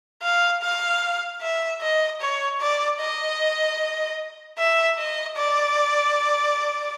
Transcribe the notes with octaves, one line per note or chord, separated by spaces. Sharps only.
F5
F5
E5
D#5
C#5
D5
D#5
E5
D#5
D5